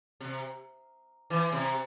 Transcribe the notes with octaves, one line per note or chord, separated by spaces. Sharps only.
C3
E3
C3